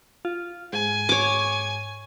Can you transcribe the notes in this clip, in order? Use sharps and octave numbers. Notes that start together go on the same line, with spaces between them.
F4
G#2 G#5
C#5 D6